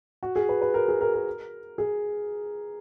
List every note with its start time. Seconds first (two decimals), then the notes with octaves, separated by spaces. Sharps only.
0.23 F#4
0.36 G#4
0.49 B4
0.62 B4
0.74 A#4
0.88 G#4
1.01 A#4
1.14 A#4
1.78 G#4